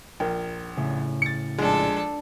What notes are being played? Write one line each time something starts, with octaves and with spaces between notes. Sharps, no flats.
A#1 A#4 G5
A2 C#3
A6 C#7
A#1 G#3 D4 A4